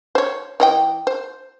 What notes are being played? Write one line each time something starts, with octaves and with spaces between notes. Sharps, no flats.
C5 C#5
E3 D#5 G5
C5